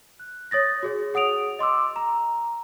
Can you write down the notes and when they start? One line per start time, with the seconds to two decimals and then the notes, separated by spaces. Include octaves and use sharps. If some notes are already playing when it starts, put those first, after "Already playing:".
0.20 F#6
0.51 C#5 D#6 A6 A#6
0.83 F#4 G#4 C#5
1.14 G#4 F#5 D#6 D7 F7
1.59 D#5 C6 D6 E6
1.96 A#5